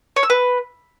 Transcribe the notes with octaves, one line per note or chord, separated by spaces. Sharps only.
C#5
E6
B4